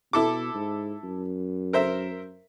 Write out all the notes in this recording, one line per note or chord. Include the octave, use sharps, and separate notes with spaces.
B2 E4 A4 D6
G#2
F#2
A#4 C5 E5